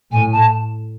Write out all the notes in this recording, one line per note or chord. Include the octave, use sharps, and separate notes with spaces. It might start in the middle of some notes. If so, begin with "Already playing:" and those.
A2 G#5
A5